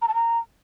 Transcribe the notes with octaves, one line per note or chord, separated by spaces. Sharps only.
A#5
A5
A#5